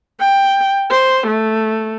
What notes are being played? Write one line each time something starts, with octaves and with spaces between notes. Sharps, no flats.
G5
C5
A3